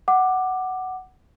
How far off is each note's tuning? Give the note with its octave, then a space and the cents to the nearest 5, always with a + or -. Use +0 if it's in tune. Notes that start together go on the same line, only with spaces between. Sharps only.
F#5 +10 D6 +15